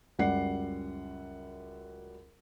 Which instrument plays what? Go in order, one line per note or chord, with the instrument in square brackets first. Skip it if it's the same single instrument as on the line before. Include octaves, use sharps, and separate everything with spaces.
[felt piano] C#2 F#2 G3 D5 F#5 C7